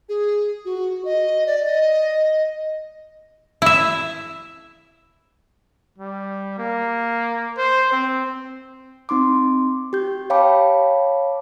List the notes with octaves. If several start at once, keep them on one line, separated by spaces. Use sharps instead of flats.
G#4
F#4
D#5
D5
D#5
E4 E5
G3
A#3
C5
C4
C4 D#4 C6 D6
G4 G6
C#5 F5 G5 A5 B5 D6